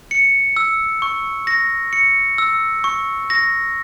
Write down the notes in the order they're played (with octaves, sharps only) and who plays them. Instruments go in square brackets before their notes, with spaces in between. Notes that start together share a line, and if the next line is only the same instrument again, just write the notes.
[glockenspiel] C#7
E6
C#6
A#6
C#7
E6
C#6
A#6